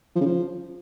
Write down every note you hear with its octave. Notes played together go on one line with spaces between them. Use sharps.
F3
C#3
F3